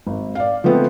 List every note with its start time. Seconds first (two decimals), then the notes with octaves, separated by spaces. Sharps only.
0.07 G#1
0.35 D5 F5
0.64 F3 G#3 A3 B3 C4